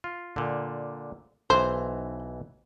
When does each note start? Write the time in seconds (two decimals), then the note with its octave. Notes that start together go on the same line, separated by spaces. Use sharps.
0.04 F4
0.36 A#2 D3
1.50 B1 E3 C5